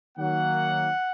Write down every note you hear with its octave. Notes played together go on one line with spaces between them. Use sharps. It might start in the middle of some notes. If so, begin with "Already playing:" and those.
D#3 F#3 A#3 F#5